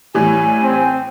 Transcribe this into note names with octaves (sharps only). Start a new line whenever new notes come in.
A2 E3 G3 G#5
C4